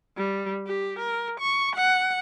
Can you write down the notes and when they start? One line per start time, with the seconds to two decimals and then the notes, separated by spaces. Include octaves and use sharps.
0.17 G3
0.67 G4
0.99 A#4
1.40 C#6
1.76 F#5